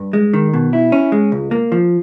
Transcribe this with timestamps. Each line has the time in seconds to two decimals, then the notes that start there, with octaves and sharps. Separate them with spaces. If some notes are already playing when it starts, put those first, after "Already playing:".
Already playing: G2
0.13 G#3
0.33 D#3
0.53 B2
0.73 E4
0.92 C#4
1.12 G#3
1.32 C#2
1.51 A#3
1.72 F3